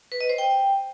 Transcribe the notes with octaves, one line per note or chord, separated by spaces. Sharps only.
B4
D#5
C5
G5